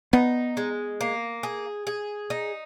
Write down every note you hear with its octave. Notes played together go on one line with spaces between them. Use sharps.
B3 D#4
G#3
A#3
G#4
G#4
D#4